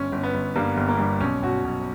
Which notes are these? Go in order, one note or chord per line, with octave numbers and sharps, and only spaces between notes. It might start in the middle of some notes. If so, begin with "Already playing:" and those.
Already playing: G1 C#4
G1
B3
G1
G2 A#3
G1
A#3
G2
B1 C#4
B1 F#4
B1